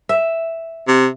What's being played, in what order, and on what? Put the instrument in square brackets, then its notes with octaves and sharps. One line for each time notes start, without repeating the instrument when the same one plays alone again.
[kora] E5
[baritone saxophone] C3